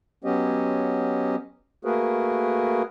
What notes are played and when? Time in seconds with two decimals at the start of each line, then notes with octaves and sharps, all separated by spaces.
0.24 F#3 B3 C#4 G4 D#5
1.85 A3 A#3 F#4 G#4 A#4 B4